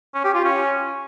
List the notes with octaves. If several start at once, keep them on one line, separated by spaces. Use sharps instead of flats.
C#4
G4
F4
C#4